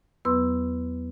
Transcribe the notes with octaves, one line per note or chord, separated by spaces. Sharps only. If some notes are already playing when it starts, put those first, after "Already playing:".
E2 F#3 B3 B4 C6 E6